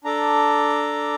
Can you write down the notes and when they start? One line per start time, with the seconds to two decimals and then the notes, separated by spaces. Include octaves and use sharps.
0.05 D4 A4 A#5 D6